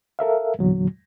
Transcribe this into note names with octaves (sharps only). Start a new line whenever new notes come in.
A4 A#4 E5 F5
E2 A#2 D3 F#3